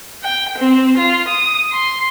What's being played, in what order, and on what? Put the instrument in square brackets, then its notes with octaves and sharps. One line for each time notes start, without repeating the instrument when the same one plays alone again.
[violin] G5
C4
F4
D#6
C6